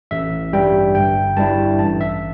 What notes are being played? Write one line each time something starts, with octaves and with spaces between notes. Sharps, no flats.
A1 E5
G2 G3 G5
G1 G5
G2 G3 E4 A5
A1 A5
E5